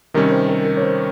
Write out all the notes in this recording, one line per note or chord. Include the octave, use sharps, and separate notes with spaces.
C3 D#3 G3 C#4 A#4
C5
A#4
A#4
C#5
C5